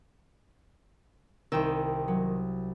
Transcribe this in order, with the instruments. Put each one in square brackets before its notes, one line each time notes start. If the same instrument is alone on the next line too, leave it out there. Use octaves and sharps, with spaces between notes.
[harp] C2 G5 E6 [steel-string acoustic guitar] D#3
[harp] F#3